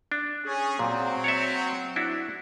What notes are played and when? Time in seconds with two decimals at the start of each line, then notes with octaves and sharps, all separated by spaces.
0.12 D4
0.45 C#4 G#4
0.79 A#2 F#3 C4
1.24 C#5 D5 E5
1.96 D4 E4 F#4